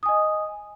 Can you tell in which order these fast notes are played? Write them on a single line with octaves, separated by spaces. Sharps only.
D#6 G#5 D#5